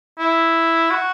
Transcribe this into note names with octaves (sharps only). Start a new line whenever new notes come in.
E4
F#4